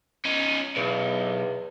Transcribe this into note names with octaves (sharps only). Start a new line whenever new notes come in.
C#4 D#4
B1 E2